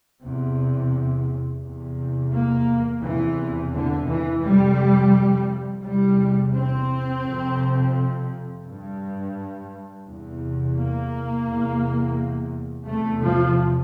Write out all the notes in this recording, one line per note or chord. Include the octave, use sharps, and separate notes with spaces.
E2 C3
E2 C3
A#3
E2 C3 E3
D3
E3
F2 C3 G3
E2 C3 G3
C4
F2 C3
G2
E2 C3
A#3
E2 C3
E2 C3 A3
F3